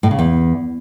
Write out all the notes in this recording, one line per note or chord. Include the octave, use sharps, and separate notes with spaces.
A2
C#3
E2